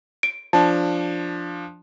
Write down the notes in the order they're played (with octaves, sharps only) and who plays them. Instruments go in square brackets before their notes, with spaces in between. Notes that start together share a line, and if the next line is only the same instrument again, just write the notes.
[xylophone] D7
[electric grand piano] F3 D4 [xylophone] A5